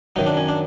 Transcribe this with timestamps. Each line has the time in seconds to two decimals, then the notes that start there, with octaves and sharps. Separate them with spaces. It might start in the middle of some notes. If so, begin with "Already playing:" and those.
0.16 F#2 D#3 F#3 D#4
0.26 D4
0.37 C#4
0.48 D4